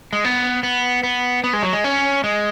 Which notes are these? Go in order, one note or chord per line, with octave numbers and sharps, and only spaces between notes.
G#3
B3
B3
B3
B3
G#3
F#3
G#3
C#4
G#3